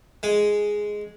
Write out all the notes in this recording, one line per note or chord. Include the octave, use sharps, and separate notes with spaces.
G#3